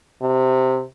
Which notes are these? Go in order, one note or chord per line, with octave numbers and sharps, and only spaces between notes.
C3